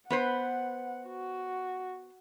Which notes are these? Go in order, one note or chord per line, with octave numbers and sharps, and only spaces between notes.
B3 B4 C5 F#5
F#4